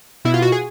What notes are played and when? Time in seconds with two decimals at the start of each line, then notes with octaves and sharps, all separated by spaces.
0.25 B2 E4
0.34 F4
0.42 F#4
0.52 G#4